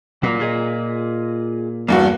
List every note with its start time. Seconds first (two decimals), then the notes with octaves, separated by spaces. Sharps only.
0.23 A#2 F#3 A#3
0.40 F4 G#4 D#5
1.89 E2 G2 A#3 F#4